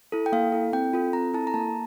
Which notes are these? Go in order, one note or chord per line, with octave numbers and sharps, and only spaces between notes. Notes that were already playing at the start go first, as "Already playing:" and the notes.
E4 A4
G5
A#3 F5
E4 A4
C4 G5
F4 A4
C4 A#5
E4 A4 A5
A#5
A#3 A5